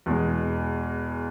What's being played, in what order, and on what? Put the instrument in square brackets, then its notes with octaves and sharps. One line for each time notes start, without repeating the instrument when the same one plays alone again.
[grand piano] E2 B2 G#3